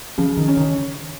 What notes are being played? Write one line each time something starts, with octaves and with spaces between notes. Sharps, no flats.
C#3 F3
D#3
C#4
D#3